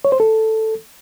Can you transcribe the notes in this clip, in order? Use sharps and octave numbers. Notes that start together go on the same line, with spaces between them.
C#5
C5
A4